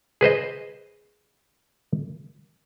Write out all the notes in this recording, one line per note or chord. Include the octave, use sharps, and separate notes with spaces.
G#4 B4 C5 D#5